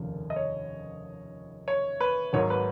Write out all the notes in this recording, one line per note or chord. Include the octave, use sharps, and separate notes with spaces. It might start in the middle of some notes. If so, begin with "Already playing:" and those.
Already playing: F1 D#2 C#3 F3 A#3
D#5
C#5
C#5
B4
G#1 G#2 F#3 A#3 C#5
B4